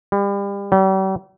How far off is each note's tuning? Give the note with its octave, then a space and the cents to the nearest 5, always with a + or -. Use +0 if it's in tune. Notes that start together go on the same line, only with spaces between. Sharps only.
G3 +35
G3 -40